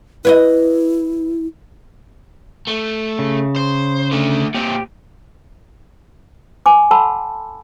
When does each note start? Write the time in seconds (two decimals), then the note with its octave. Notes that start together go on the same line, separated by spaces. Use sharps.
0.25 E4 B4 C#5 D#5
2.67 A3
3.19 C#3
3.56 C5
4.11 D3 A3
4.55 A#2 C4 G4
6.66 G#5 D6
6.91 A4 F#5 A5 B5 C6 E6